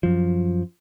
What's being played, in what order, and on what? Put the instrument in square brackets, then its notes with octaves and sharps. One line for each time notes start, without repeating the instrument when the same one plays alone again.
[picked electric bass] F#2 F3